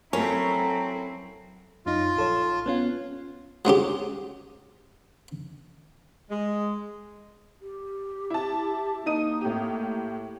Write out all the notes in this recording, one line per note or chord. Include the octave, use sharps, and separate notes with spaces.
F#3 A3 C4 C#4 E4 A#4 A#5
F#2 D#4 F4
A#1 A4 C#5
B3 C#4 F4
F#3 G#3 C#4 G4
G#3
G4
E4 A5
A#3 D#4 D#6 D#7
A2 G4